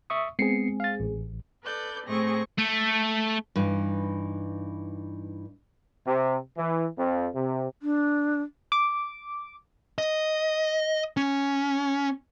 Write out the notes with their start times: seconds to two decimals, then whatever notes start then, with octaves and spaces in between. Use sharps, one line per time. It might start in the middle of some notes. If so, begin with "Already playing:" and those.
0.10 E5 C#6 D#6
0.39 G#3 B3 C4 G#4 C7 C#7
0.80 F5 A6
1.00 A1
1.63 A4 B4 D5 G6
2.07 A2 A3 C4 G#4 C#6 A#6
2.58 A3
3.56 G2 E3 D#4
6.06 C3
6.57 E3
6.97 F2
7.34 C3
7.82 D4
8.72 D6
9.98 D#5
11.17 C#4